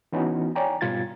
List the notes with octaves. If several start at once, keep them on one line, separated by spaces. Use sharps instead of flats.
E3 B3 C#4 D#4 E4 F#4
C#5 D5 G5 G#5 A#5
G#2 B2 G3 F4 G#6 A6